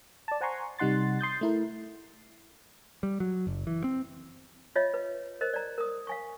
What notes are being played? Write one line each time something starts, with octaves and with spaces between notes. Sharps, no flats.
D5 A5
C5 F#5 G#5 A#5 C6 C#6
C3 G3 D#4 F#5 C6 A6
C6 D#6 G6 A6
A3 E4 A#4
G3
F#3
F#1
E3
C4
F4 C#5 D#5 E5
B4
A#4 C5 D#5
D5 A#5
A#4 D#6
F5 G#5 C#6